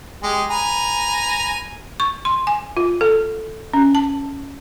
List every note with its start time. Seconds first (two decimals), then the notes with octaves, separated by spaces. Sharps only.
0.23 G#3 G4
0.49 B4 G#5 A#5
2.00 C#6
2.25 C6
2.47 G#5
2.77 F4
3.01 A4
3.73 C#4
3.95 A5